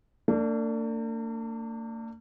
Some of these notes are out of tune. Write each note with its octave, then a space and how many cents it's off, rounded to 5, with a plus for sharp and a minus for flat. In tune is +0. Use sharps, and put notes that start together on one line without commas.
A#3 -45 D4 +0